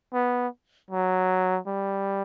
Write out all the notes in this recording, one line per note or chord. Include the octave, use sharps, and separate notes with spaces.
B3
F#3
G3